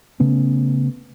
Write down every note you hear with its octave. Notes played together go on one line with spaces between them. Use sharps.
C#3 A3 B3 C#4